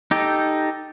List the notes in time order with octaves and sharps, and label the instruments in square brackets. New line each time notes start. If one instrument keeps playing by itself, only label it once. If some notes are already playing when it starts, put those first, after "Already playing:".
[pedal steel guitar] D#4 G4 A4